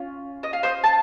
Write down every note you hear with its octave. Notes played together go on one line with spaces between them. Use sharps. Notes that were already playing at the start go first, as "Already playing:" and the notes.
Already playing: C#4 F4
D#5
F5
C5 D#5
A5